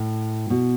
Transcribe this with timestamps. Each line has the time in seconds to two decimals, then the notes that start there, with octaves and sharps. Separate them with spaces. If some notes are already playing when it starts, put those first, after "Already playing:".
Already playing: A2
0.50 B2